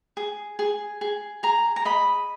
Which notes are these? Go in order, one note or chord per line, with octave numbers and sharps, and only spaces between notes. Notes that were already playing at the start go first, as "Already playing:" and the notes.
G#4
G#4
G#4
G#4 A#5
A#5
D#5 B5